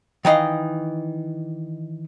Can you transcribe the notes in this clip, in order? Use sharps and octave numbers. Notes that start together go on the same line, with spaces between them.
D#3 E3 D#5 F5